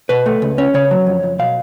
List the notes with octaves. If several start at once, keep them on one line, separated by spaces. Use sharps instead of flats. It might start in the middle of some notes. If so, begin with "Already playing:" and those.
B2 B4
A3
C#2
C#4
C#3 C#5
F#3
F2
F2
B2 F5